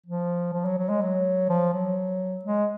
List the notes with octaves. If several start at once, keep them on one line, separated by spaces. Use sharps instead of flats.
F3
F3
F#3
F#3
G#3
F#3
F3
F#3
G#3